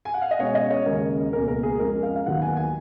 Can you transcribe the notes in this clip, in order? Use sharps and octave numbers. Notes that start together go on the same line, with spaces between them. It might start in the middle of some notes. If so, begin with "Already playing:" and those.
G#5
F#5
F5
D#5
B2 G#3 C#4 C#5
D#5
C#5
D#2 C#3 G#3 C#4 A#4
C#2 B2 A#3 C#4 A#4
A#4
G#4
F2 F3 G#3 C#4 A#4
F5
F5
D#2 D#3 F#3 B3 F#5
G#5
G#5